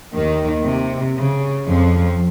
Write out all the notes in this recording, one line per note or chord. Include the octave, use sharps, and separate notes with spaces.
D#2 D#3
C3
C#3
F2 F3